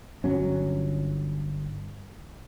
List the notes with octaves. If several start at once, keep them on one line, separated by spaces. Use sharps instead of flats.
G1 F#3 C#4